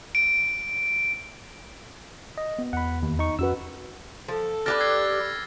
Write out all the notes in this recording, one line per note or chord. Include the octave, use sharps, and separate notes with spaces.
D7
D#5
B3
E2 F#5 B5
D#2
D#4 C#6
F2 C#4 F#4 B4 E6
F3 A4
D4 G4 B4 F6 A6 A#6
E6 G#6 C7